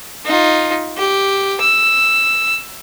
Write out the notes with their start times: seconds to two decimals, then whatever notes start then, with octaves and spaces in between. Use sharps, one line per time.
0.25 D#4 F4
0.97 G4
1.61 E6